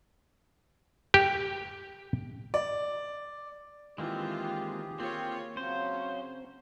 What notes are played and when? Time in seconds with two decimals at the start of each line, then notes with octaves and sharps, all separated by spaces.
1.14 G4
2.54 D5
3.98 D#3 E3 G#3 A#3 C4 F4 G4 G#4
5.00 A#3 C4 F4 C#5
5.57 C#3 F#3 C4 C#4 C5